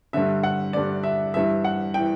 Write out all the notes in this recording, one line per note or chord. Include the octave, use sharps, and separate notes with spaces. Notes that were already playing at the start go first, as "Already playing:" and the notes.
G2 D3 E5
F#5
G2 D3 D5
E5
G2 E3 E5
F#5
G5
E3